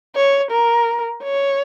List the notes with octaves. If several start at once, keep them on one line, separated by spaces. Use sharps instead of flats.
C#5
A#4
C#5